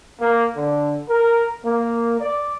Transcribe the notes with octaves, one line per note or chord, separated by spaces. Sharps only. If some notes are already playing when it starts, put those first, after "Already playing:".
A#3
D3
A#4
A#3
D5